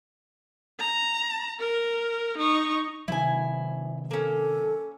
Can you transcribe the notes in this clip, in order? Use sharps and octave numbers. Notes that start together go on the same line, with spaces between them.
A#5
A#4
D#4 C#6
C3 D#3 F#3 E4 G#5
A#3 C#4 A4